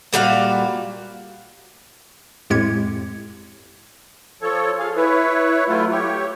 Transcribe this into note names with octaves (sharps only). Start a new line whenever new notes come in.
A#2 G3 F#4 F5
F2 A2 G#3 G4 G#6 C#7
F3 A4 C#5
G#4 F5
E4 B4 C#5
F#3 A3 E4 F4
G4 C#5